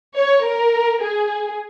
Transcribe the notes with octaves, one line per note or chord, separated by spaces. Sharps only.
C#5
A#4
G#4